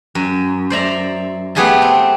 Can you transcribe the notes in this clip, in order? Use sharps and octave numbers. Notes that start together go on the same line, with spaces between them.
F#2
C5 D5 E5 A#5
A3 B3 G4 G#4 E5 A5
C4